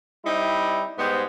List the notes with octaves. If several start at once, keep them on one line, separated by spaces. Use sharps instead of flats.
G3 C4 D#4 E4
G#2 G3 B3 C5